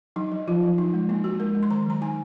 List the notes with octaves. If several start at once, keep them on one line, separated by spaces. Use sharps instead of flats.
F#3 D#4
F#3
F3 F4
F3
D#4
G#3
A#3 D#4
D#4 F#4
G#3 A#4
G#3
C6
D#3 A#5
F#3 A#5
D#4 G#5